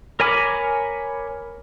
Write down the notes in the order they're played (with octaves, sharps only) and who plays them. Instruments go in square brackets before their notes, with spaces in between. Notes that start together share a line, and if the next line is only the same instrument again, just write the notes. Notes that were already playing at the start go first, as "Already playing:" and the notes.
[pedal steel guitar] A#4 C#5 G#5 B5 D6